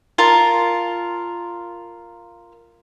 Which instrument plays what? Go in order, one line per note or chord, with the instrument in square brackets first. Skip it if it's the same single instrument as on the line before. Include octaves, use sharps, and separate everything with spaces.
[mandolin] F4 A#4 A5